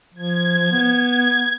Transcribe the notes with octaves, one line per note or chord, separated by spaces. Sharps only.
F3 G#6
B3